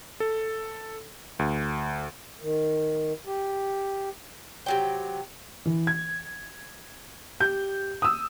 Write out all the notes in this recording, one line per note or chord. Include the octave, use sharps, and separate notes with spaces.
A4
D2
D#3
G4
C3 F#3 G5
E3
G#6
G4 G6
D#6 E6